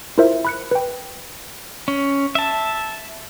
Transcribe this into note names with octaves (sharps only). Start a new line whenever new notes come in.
E4 F4 A#4 C5 E5
B5 F#6 C#7
B4 G5
C#4
E5 A5